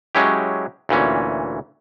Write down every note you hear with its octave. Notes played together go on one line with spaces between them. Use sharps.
F#3 G#3 C#4 E4 G4
D2 A#2 E3 C#4